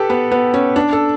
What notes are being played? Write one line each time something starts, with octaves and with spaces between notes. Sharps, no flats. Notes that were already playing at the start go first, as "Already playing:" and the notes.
Already playing: G4 A4 B4
B3
B3
C#4
D4
A4